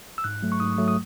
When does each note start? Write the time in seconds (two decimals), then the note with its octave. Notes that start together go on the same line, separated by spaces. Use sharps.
0.18 E6
0.24 G#2 F#6
0.43 F#3 A3
0.52 C#6
0.60 G#2 D#6
0.78 F#3 A3
0.88 D#6